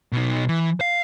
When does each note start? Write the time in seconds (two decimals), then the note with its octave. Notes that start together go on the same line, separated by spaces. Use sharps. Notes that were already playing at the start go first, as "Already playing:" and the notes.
0.12 B2 D#4
0.48 E3
0.81 F5